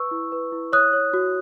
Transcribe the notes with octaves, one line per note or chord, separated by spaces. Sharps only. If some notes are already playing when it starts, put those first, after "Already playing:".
Already playing: B4 C#6 E6
E4
B4
E4
C#5 D#6 F#6
C#5
F#4